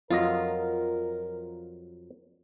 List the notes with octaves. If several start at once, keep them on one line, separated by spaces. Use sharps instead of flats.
F2 F#3 F4 A#4 D#5